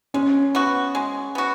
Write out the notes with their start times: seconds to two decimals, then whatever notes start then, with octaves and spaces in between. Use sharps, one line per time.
0.14 G#3 C#4
0.55 B3 F#4
0.95 G#3
1.35 B3 F#4